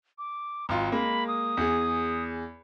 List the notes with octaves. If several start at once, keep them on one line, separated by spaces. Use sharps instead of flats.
D6
G#1 F4 A#5
G#3 A#3 B5
D#6
E2 G#4